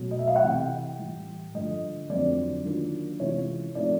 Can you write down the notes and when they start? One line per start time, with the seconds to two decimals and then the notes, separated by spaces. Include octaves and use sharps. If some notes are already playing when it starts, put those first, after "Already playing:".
Already playing: B2 F#3 A3
0.11 D#5
0.19 E5
0.27 F5
0.36 F#5
0.44 C3 E3 A3 G5
0.99 A2 E3 G3
1.54 G2 D3 F3 A3 D#5
2.09 F2 D3 F#3 A3 C4 D5
2.64 D#3 F#3 A#3 D4 F4
3.20 C3 E3 G#3 C#4 F4 C#5
3.75 A2 F3 A3 C4 D#4 D5